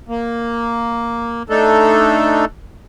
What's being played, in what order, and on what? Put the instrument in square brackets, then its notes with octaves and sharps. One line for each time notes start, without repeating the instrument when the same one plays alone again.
[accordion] A#3
A3 D4 D#4 A4